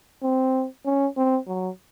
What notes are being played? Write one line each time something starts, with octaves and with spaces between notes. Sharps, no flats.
C4
C#4
C4
F#3